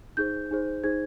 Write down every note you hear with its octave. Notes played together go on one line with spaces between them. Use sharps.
D#4 G#4 C5 G6
D#4 G#4 C5
D#4 G#4 C5 G#6